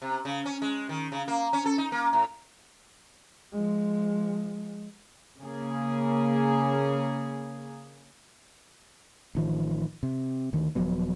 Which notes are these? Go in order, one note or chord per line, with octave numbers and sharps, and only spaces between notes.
C3
C#3
C#4
G#3
D#3
C#3
A#3
C#4
A4
D#4
A#3
A2
F3 G#3
C#3 A#3 G#4
A1 D#3 F3
C3
D2 D#3
D#1 F3 F#3 B3